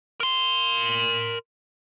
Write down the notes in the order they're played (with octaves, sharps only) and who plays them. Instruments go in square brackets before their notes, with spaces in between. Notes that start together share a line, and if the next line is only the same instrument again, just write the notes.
[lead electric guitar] A#4 C6